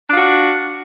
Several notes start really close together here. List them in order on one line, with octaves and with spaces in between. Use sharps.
D4 F4 F#4